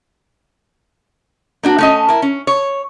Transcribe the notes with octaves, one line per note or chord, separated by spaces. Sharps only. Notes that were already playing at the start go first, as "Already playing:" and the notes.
A#3 D4 F#4
A3 C#4 D#5
E4 A#4
C#4
C#5